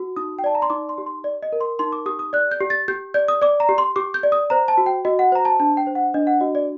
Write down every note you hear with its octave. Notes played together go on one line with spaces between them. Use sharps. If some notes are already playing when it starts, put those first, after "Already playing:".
Already playing: F#4
D#4 D#6
G5
D5 A5
A#5
C6
D#4 D6
C6
G4
C6
D5
D#5
A#4
C6
D#4 C6
D6
G4 D#6
D#6
D5 F#6
G6
G4
A6
G4 G6
D5 G6
D#6
D5 D6
A#5
G4
C6
G4 D6
G6
D5
D#6
C5 A#5
A5
F#4
G5
F#4 D#5
F#5
C5 A#5
A5
D4 A5
G5
C5
F#5
D4 D#5
F#5
F#4 D#5
D5